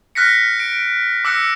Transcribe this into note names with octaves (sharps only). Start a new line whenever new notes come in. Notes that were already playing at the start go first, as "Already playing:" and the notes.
F6 F#6 A#6 B6 C#7
D7
D6 E6 F#6 A#6 C#7